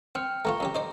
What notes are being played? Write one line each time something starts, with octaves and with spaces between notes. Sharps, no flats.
C4 G5 F6
A3 B3 F4 A#5 C#6
F2 C#4 G4 A#5
D#4 C5 D5